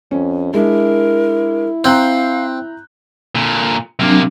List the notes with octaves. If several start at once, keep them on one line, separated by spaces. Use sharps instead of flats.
F2 C#4
G#3 D4 E4 A#4 E5
C4 F5 A#5 F#6 G6
A#2 D3
C3 F#3 A#3 C4 D4